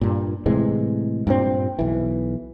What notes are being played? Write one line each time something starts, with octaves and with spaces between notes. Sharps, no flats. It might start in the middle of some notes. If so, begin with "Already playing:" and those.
G2 A#2
A2 C3 E3 G#3
G2 A#2 C4
B1 E3